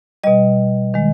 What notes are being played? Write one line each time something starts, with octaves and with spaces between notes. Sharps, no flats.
B2 G3 D#5
D#3 G#3